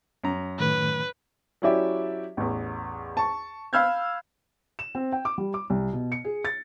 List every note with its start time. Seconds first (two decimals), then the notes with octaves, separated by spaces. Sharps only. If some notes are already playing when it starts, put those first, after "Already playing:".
0.24 F#2 A#5
0.59 A2 D#3 A3 B4
1.62 F#3 C#4 E4 G4 D5 E5
2.37 A1 E2
3.17 A5 C#6
3.73 F5 B5 E6 F6 G6 G#6
4.79 E7
4.95 C4
5.12 G5
5.25 D6
5.38 G3
5.54 D6
5.70 C2
5.93 B2
6.12 C#7
6.24 G#4
6.45 A6